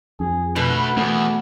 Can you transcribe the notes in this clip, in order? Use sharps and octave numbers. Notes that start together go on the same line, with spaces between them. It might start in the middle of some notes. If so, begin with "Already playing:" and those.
F2 G#4
B2 D3 A3 B4
E2 A3 B3